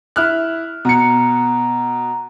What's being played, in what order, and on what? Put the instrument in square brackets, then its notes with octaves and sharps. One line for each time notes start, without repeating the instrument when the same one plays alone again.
[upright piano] E4 F6 F#6
[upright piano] B2 C#7 [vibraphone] A#5